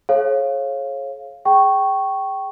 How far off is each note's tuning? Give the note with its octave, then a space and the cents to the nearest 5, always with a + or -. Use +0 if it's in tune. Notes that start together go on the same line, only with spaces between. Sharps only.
G#4 +45 C#5 -30 F5 +0
G#4 +5 G5 -20 C#6 -5